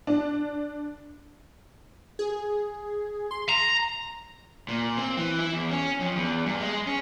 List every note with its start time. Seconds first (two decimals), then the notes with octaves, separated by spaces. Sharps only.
0.07 D4
2.19 G#4
3.31 C6
3.49 A#5
4.68 A#2
4.97 C4
5.17 E3
5.39 E4
5.53 E2
5.71 C#4
6.00 F2
6.16 E2
6.46 G2
6.60 G#3
6.87 C#4